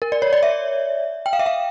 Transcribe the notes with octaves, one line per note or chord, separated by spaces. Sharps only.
A#4
D5
C#5
D5
E5
G5
F5
E5
F5